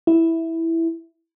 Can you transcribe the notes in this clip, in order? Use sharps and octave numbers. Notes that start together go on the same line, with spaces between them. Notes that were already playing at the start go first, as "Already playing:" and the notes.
E4